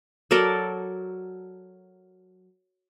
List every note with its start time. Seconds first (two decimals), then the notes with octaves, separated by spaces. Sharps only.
0.31 F#3 A4 A#4 D5